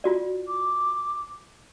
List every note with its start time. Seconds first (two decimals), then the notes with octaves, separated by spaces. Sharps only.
0.04 F4 F#4 D5
0.48 D6